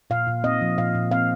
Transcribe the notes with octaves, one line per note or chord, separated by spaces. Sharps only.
A#2 F5
A#2
C4 D#5
F3
A#2 F5
A#2
C4 F5